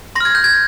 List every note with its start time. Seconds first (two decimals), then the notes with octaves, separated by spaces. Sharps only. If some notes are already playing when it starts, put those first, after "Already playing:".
0.15 C6 A#6
0.20 F6 G#6
0.35 G6
0.44 G#6